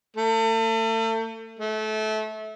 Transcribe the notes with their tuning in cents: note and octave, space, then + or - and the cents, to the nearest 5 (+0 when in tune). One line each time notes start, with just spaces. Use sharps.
A3 +35
A3 -25